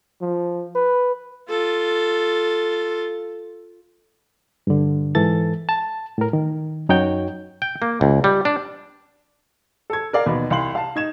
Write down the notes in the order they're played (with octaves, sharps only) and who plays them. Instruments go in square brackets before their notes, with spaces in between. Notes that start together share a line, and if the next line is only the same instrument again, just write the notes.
[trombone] F3
B4
[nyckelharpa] F4 A4
[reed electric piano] G2 D3
G#2 E3 A4 A6
A5
A2 A#4
D#3
F#2 D#4 F#4 C#5 G5 G6
[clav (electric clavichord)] G5
A#3
C#2
G3
D4
[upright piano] A4 G#6
A#4 D5 F5
D#2 B2
C2 F5 C6 F#7
F5 A5
D#4 G#6 E7